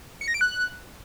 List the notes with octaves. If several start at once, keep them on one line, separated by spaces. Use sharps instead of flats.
C#7
A#6
D7
F#6